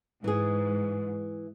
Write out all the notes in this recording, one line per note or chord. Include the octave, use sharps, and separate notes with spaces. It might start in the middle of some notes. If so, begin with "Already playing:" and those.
G#2 E3 G#4